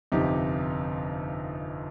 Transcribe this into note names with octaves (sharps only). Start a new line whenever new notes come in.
G1 F2 C3 D#4 G4